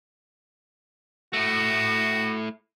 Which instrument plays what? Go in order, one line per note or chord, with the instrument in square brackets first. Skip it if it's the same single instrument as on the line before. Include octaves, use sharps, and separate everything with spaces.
[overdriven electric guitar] A3 E4 [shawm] F#4